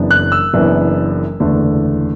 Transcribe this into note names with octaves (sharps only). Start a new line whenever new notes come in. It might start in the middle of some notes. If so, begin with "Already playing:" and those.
Already playing: F#1 F#2 E3 B3 D4
F#6
E6
F#1 F#2 E3 B3 D4
F#1 E2 D3 A3